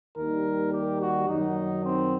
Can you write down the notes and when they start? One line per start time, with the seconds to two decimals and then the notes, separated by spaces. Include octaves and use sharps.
0.15 D#2 D#3 G3 A#4
0.72 G4
1.00 F#4
1.27 F#2 D#3 F#3 D#4
1.84 C4